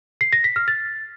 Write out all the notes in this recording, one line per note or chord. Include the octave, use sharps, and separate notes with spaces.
C7
A#6
B6
F6
A6